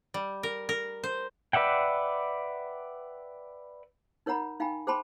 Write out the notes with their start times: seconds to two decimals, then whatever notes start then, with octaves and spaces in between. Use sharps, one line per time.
0.14 G3
0.43 A#4
0.69 A#4
1.04 C5
1.53 B4 D5 E5 F#5 G5
4.26 D#4 A#4 C#5 F#5 A#5 B5
4.60 D#4 F5 G5 G#5 B5
4.87 G#4 C5 G5 A5 B5 C6